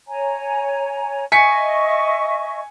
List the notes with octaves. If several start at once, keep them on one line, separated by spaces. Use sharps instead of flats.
C#5 G#5 A#5
D#5 E5 G#5 C#6 B6 C#7